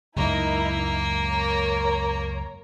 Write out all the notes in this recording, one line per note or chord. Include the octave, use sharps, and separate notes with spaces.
C#2 F#2 G#3 A#3 D#4 E4 A#4
A#4 C#5 A#5